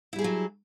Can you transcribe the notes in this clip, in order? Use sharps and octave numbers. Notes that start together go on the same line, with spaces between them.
F#3 G3 E4 G#4 A4